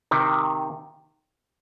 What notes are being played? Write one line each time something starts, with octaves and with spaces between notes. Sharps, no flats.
C3 D#3